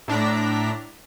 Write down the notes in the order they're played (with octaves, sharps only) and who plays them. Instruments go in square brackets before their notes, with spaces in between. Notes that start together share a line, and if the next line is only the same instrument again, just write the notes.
[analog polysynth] A2 D4 A#5 B6